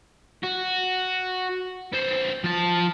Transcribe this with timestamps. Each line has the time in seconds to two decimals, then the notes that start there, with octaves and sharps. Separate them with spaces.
0.44 F#4
1.93 B3 C5
2.44 F3 A5